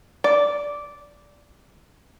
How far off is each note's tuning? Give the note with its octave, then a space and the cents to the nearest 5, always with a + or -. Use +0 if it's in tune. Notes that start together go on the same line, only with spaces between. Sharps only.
D5 -10